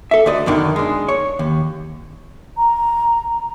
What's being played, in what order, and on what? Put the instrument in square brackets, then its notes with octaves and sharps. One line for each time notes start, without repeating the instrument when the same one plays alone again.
[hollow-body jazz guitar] A4 E5
D2 C5 D5 D#5
F#2 B2 D3 D#3
G#3 D4
C#5
D#2
[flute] A#5